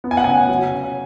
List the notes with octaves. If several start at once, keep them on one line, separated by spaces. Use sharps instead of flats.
B3
G#5
F#5
C#3 G#5
F#3
C#3